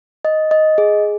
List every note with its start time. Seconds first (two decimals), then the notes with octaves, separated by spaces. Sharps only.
0.25 D#5
0.51 D#5
0.78 G#4